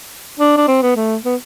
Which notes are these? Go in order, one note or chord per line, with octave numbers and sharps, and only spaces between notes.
D4
D4
C4
B3
A3
B3